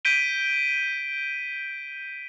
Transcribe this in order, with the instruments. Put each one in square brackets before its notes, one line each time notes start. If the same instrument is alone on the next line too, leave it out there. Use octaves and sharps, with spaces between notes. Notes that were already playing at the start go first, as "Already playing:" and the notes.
[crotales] G6 B6 D7 D#7 G7